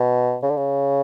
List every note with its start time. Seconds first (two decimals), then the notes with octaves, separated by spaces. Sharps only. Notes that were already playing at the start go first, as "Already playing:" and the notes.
Already playing: B2
0.43 C#3
0.50 D3
0.57 C#3